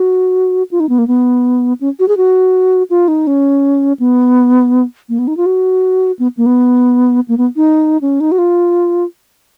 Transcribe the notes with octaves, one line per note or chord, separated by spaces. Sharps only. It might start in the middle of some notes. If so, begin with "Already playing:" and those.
Already playing: F#4
F4
D#4
B3
A#3
B3
C#4
F#4
G#4
F#4
F4
D#4
C#4
B3
A#3
B3
D#4
F4
F#4
B3
A#3
B3
A#3
B3
D#4
C#4
D#4
F#4
F4